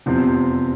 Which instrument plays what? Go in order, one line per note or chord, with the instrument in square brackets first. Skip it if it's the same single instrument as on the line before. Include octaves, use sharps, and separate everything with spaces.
[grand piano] F1 E2 C3 F3 C4